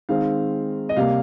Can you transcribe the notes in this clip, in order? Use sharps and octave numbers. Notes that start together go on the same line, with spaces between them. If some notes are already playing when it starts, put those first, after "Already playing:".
D#3 G#3 C4 F5
D#5
C3 G3 A#3 F5